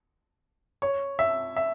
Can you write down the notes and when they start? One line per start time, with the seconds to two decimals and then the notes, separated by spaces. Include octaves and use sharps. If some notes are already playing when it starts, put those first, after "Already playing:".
0.82 C#5
1.19 E5
1.56 E5